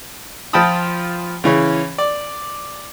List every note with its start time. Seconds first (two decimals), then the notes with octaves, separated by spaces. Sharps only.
0.53 F3 F4 G5 A5 B5 D#6
1.44 C#3 E3 C#4
1.98 D5